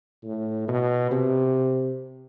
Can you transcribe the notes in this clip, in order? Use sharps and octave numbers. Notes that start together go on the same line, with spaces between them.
A2
B2
C3